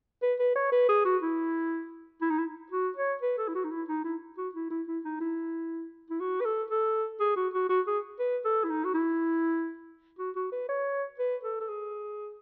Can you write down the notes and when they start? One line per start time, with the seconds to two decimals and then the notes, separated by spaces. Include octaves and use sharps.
0.22 B4
0.39 B4
0.56 C#5
0.72 B4
0.89 G#4
1.05 F#4
1.22 E4
2.22 E4
2.30 D#4
2.38 E4
2.72 F#4
2.96 C#5
3.22 B4
3.38 A4
3.48 E4
3.55 F#4
3.64 D#4
3.71 E4
3.88 D#4
4.04 E4
4.37 F#4
4.55 E4
4.71 E4
4.88 E4
5.04 D#4
5.20 E4
6.10 E4
6.20 F#4
6.41 B4
6.45 A4
6.70 A4
7.20 G#4
7.36 F#4
7.54 F#4
7.69 F#4
7.87 G#4
8.19 B4
8.45 A4
8.64 E4
8.70 D#4
8.85 F#4
8.94 E4
10.19 F#4
10.36 F#4
10.52 B4
10.69 C#5
11.19 B4
11.43 A4
11.60 A4
11.69 G#4